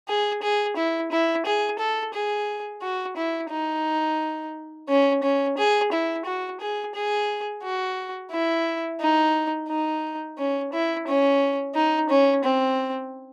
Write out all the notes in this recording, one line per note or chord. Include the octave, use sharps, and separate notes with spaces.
G#4
G#4
E4
E4
G#4
A4
G#4
F#4
E4
D#4
C#4
C#4
G#4
E4
F#4
G#4
G#4
F#4
E4
D#4
D#4
C#4
E4
C#4
D#4
C#4
C4